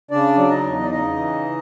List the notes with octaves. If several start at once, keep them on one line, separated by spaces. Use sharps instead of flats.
C#3 D4 D5
F#3 D5
D#4 D#5
E2
D5
C#3 D#4 D#5
E3